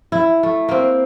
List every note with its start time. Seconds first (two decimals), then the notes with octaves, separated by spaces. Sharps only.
0.12 E4
0.43 A3
0.69 A#3 C4